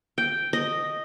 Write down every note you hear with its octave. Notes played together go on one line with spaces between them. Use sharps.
G5
D#5